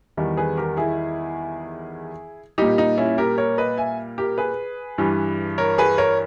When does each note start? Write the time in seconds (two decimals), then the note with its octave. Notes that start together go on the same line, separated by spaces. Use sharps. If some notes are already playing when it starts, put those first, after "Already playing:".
0.17 E2 D#3 G3
0.37 G#4 B4
0.57 G4 A#4
0.77 E4 G#4
2.58 A#2 G3 D#4 G4
2.78 D#4
2.98 C#4 E4
3.18 G4 A#4
3.38 A#4 C#5
3.58 B4 D#5
3.77 E5 G#5
4.18 G4 A#4
4.38 G#4 B4
4.98 G2 E3 G3
5.58 A#4 C#5
5.78 G#4 B4
5.98 A#4 C#5